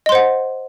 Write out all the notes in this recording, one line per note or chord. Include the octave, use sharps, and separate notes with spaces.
C5 D#5 F#5 C6